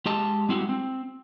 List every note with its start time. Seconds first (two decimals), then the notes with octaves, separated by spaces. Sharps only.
0.06 G#3 G4 D#5 A5
0.49 G3 G#3 C4 E4 F#4 G4
0.69 C4